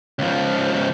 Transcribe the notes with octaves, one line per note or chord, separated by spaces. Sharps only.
C#2 F3